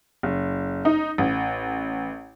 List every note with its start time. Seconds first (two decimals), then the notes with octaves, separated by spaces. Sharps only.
0.23 F#1
0.85 D#4
1.18 A1